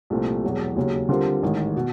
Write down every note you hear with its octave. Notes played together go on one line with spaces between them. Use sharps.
C2 A#2 F3 A3 C4
E1 E2 B2 F#3
D#2 C#3 F#3
D3 G3 C4 F4 A#4
A1 G#2 D#3
B2